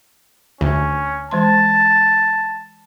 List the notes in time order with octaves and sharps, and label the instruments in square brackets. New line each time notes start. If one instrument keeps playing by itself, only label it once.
[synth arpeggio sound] D2 [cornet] C#4
[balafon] E3 G#3 C6 [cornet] A5